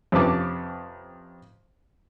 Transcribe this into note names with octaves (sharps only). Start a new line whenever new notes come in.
F2 C3 C#4 B4 A5 D6